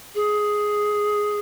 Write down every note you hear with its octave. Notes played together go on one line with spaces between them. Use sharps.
G#4